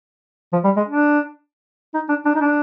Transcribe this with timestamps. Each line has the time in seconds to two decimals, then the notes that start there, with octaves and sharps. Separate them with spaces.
0.53 F3
0.64 G3
0.76 G#3
0.88 D4
1.94 D#4
2.09 D4
2.25 D4
2.35 D#4
2.41 D4